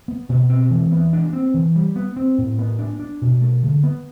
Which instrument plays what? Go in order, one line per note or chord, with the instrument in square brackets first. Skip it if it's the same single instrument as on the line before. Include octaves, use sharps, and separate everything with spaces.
[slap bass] B3
B2
C4
E3
B3
D4
C4
E3
G3
B3
C4
A2
B3
D4
D4
B2
A3
D3
B3